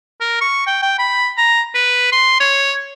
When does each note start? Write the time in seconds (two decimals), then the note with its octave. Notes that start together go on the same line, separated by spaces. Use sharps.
0.21 A#4
0.41 C#6
0.67 G5
0.83 G5
0.99 B5
1.38 A#5
1.75 B4
2.12 C6
2.40 C#5